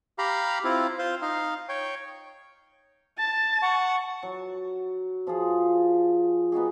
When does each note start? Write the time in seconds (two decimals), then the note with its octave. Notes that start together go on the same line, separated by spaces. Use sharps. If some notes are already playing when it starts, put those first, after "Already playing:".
0.18 G4 F5 A#5 B5
0.64 C4 E4 F4
0.99 F4 C5
1.22 D#4 F5
1.69 C#5 G5
3.18 A5 A6
3.62 F#5 C#6
4.23 F#3
5.27 F3 F4 F#4 G#4
6.52 B3 D#4 F#4 G#4